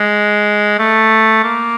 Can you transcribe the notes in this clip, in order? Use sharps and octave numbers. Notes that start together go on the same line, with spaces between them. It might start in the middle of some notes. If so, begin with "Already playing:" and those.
Already playing: G#3
A3
A#3